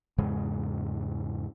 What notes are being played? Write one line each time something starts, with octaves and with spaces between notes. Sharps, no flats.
E2 G#2 C#3 G#3